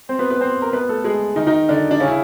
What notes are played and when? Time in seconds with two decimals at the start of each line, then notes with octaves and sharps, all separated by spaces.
0.09 C4 C5
0.19 B3 B4
0.30 B3 B4
0.41 C4 C5
0.62 A#4
0.73 B3 B4
0.89 A3 A4
1.04 G#3 G#4
1.36 D#3 D#4
1.46 D#3 D#4
1.69 D3 D4
1.91 D4
2.00 C#3 C#4
2.08 E4